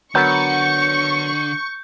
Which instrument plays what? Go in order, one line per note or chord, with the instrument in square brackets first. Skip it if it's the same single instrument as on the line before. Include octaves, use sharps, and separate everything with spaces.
[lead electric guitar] D3 [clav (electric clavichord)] F#3 B3 A#4 [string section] C#6 [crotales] G6